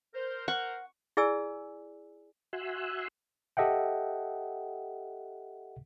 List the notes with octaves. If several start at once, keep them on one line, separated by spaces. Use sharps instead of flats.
A#4 C5
A#4 C5 F#5 C#6
E4 G#4 D5 G#5 E6
F#4 E5 G#5 C6 E6 F#6
G4 A4 D#5 E5 F#5 G5